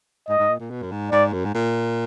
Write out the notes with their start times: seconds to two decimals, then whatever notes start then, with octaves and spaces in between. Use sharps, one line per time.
0.29 G#2 D#5
0.39 G#2
0.49 A#2
0.60 A#2
0.70 B2
0.82 F#2
0.91 G#2
1.11 G#2 D5
1.33 F#2
1.45 G#2
1.54 A#2